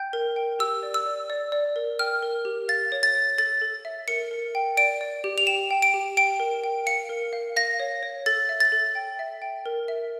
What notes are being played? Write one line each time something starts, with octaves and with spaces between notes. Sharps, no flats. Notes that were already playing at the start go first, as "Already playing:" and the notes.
Already playing: G5 G6
A#4
G5
G4 E6
D5
E6
D5
D5
D5
A#4
G5 F6
A#4
G4
F5 A6
C#5
A6
C#5
A4 A6
A4
E5
A#4 C#7
A#4
G5
D5 D7
D5
G4
F7
G5 E7
G5
D7
G4
G5 D7
A#4
G5
F5 C#7
A#4
F5
F5 A#6
C#5
C#5
A4 A6
E5
A6
A4
G5
E5
G5
A#4
E5